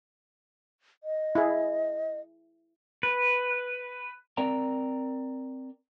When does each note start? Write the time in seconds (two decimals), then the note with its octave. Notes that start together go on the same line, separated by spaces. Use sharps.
1.04 D#5
1.35 E4 G#4
3.03 B4
4.37 C4 A#4 D5 G5 A#5